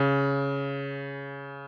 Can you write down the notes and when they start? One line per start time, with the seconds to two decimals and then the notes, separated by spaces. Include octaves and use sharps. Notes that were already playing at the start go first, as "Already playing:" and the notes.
Already playing: C#3